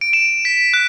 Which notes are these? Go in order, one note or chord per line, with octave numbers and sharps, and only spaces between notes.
D7
E7
B6
F#6